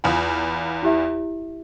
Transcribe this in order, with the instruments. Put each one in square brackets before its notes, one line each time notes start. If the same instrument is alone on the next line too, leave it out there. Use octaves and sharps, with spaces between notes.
[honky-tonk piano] E2 F4 B5 [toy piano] G#5 D#6
[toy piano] E4 G4 E5